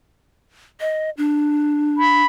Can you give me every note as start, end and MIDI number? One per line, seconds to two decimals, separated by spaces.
0.80 1.10 75
1.17 2.23 62
1.97 2.26 83